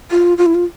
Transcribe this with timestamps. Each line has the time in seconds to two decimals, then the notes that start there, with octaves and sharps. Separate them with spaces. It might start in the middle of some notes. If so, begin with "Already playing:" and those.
0.11 F4
0.38 F4
0.46 E4
0.55 F4